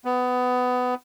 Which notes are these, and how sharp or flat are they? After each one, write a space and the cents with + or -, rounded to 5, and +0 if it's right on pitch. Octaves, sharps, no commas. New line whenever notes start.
B3 +20